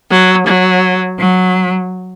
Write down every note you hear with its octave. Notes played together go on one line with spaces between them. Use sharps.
F#3
F#3
F#3